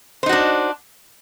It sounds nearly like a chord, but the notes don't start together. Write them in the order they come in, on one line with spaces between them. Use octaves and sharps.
C5 D#4 F#4 D4